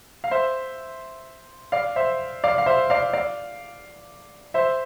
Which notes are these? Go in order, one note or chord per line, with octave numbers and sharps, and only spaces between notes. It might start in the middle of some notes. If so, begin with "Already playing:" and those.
F5
C5 E5
D5 F5
C5 E5
D5 F5
F5
C5 E5
D5 F5
D5 F5
C5 E5